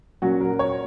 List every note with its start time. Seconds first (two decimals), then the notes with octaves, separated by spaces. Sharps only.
0.22 A#2 F#3 C#4 F#4
0.41 A#4
0.59 C#5